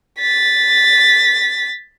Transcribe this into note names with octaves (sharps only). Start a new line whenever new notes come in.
A6 B6